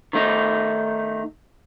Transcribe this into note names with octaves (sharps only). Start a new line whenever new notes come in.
D#3 A3 D#4